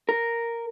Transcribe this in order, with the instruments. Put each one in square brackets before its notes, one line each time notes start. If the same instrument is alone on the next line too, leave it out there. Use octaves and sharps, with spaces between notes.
[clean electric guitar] A#4